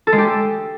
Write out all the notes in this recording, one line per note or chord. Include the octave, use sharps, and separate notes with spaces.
A4
G#3
G4